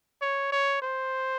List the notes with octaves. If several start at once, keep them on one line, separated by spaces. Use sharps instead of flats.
C#5
C#5
C5